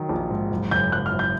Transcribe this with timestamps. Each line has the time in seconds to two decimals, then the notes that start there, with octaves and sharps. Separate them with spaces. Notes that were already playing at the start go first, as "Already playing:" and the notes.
Already playing: D#3 F#3
0.09 A#1
0.30 G#2
0.51 F#1
0.71 F#1 G6
0.92 F#1 F#6
1.06 F6
1.12 F#1
1.19 G6